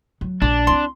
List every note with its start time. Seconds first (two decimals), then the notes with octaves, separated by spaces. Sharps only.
0.21 F#3
0.42 A#1 D4
0.67 C4 E4 C6